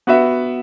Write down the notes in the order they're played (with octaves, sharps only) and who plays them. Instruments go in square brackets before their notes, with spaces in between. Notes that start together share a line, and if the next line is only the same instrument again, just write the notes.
[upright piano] B3 F#4 B4 E5